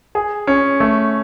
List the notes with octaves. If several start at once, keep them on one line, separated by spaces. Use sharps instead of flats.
G#4
C#4
A3